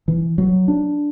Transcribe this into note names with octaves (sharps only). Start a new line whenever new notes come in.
E3
F#3
D4